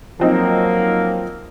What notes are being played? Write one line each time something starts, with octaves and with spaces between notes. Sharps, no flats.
F3 F#3 A#3 C4 D#4